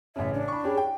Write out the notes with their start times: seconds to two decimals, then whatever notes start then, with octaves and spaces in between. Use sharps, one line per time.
0.16 A1 C#3 E5
0.33 D4
0.48 B5 C#6
0.64 C#4 G4 G#4
0.77 G5